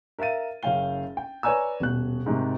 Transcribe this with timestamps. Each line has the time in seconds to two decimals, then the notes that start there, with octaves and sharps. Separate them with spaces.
0.19 A#4 E5 F5 A6 D#7
0.63 F#1 C#4 F5 G5 G7
1.17 G5
1.43 B4 C#5 D5 G#5 A#5 E6
1.80 D#1 B2 F#6
2.26 G#2 C3 D#3